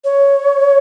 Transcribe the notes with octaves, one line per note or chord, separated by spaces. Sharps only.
C#5